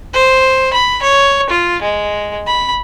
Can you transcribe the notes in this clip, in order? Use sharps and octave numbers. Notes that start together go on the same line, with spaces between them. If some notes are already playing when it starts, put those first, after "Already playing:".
C5
B5
C#5
F4
G#3
B5